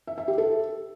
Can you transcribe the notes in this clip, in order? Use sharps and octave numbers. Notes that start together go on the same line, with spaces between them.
E5
E5
G4
A4